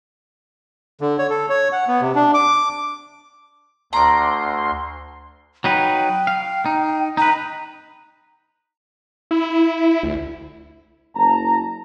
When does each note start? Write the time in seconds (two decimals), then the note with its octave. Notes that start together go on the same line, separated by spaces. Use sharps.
1.01 D3
1.19 C#5
1.30 A4
1.49 C#5
1.72 F#5
1.88 B3
2.01 C3
2.15 D4
2.34 D6
3.93 D2 D5 A#5 C6
5.64 F#3 D#4 B4 G5
6.27 F5
6.66 D#4
7.17 D#4 B4 A#5
9.31 E4
10.03 D2
11.15 F#1 A5 A#5